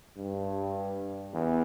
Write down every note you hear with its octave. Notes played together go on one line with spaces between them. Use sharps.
G2
E2